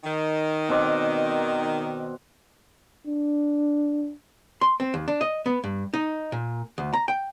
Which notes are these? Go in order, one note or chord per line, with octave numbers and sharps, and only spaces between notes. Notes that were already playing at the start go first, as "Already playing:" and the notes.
D#3
B2 C4 D5
D4
C6
C4
D#2
D4
D#5
B3
G2
D#4
A#2
D2
A#5
G5